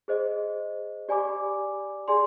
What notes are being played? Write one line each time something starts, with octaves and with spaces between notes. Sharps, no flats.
G#4 C5 D#5
G4 D5 G#5 B5 D6
G#4 D5 G#5 C6